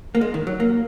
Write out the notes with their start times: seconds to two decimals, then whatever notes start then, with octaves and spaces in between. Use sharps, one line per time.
0.15 A#3
0.21 G#3
0.34 D#3
0.47 F#3
0.60 A#3